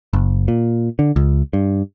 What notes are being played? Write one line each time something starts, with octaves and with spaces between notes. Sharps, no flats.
F#1
A#2
D3
C#2
G2